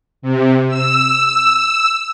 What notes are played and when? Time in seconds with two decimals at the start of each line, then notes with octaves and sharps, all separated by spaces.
0.22 C3
0.68 E6